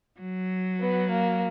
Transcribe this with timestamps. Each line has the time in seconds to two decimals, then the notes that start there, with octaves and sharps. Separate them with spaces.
0.20 F#3
0.81 B3
1.10 A#3